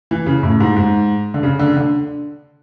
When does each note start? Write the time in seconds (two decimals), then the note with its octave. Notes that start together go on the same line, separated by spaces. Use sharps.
0.11 E3
0.26 C#3
0.43 A2
0.60 G#2
0.76 G#2
1.34 D3
1.43 C#3
1.59 D3
1.77 D3